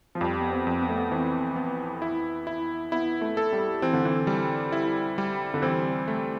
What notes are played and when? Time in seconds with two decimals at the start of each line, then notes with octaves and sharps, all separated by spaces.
0.15 F3
0.21 F2 G3
0.41 B3
0.52 C4
0.67 F2
0.81 B3
0.89 A3
0.96 B3
1.11 E3 C4
1.56 B3
2.02 E4
2.47 E4
2.92 B3 E4
3.21 A3
3.37 A4
3.53 G3
3.82 E3 C4
3.93 D3
4.05 E3
4.27 G3
4.72 E4
5.18 G3
5.54 D3
5.62 E3 C4
6.08 A3